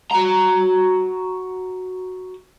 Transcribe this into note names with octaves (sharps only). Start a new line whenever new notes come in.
F#4 A#5